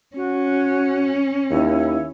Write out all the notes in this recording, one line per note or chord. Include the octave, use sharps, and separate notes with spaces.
C#4 F#4
D#2 E4